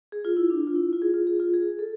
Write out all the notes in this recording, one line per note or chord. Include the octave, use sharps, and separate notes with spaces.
G#4
F4
E4
D4
F4
E4
F4
G#4
F4
G#4
F4
G#4
A4